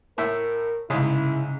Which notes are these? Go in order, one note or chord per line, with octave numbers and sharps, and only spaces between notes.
A2 A#4 E5
C2 G#2 C#3 E4 D#6